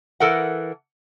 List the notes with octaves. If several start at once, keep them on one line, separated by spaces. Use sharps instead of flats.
E3 A4 A#4 F#5